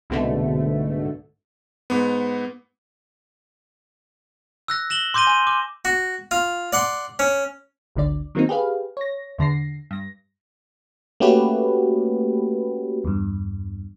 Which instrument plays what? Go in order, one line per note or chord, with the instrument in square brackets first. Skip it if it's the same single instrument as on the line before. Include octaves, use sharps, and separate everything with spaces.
[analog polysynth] C2 G#2 B2 D3 A3
[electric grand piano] G#2 B3
[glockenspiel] E6 F#6 A#6
A#6 E7 F#7 G7
C6 D6 G6 A#6 D#7 G7
G#5 D#7
D6
[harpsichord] F#4
F4
D5 F#5 C6
C#4
[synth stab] G#1 D2 D3 D5
D#3 F#3 A#3 C4 D#4
G4 G#4 B4 F5
C#5 A#6
E2 D3 A#6 C7
G2 A#6
[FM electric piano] A3 A#3 C#4 F#4 G4 B4
E2 G2